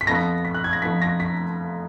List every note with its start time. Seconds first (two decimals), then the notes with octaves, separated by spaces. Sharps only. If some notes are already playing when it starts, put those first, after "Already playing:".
0.01 B6
0.07 F2 F3 B3 A#6
0.45 B6
0.54 F#6
0.64 G#6
0.73 A#6
0.82 F2 F3 B3 B6
1.02 A#6
1.20 B6